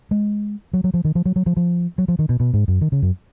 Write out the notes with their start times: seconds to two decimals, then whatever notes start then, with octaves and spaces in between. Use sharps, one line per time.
0.11 G#3
0.73 F#3
0.84 F#3
0.94 F3
1.05 D#3
1.15 F3
1.25 F#3
1.36 F#3
1.46 F3
1.57 F3
1.98 F#3
2.08 F3
2.19 D#3
2.29 B2
2.40 B2
2.54 G#2
2.68 F#2
2.81 D#3
2.92 C#3
3.02 F#2